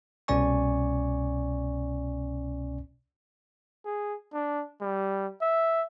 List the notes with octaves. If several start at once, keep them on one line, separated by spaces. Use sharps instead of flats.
C2 B2 C#4 D5 G#5 C#6
G#4
D4
G3
E5